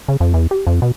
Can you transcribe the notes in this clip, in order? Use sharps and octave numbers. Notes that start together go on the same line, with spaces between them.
C#3
F2
E2
G4
F2
B2